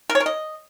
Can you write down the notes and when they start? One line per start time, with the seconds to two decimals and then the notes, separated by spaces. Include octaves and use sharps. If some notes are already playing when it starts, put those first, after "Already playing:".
0.10 A#4
0.15 C#5
0.20 A#4
0.26 D#5